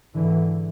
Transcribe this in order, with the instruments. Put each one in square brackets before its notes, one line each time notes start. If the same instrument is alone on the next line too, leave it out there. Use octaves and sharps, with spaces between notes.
[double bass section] G#2 D3 E3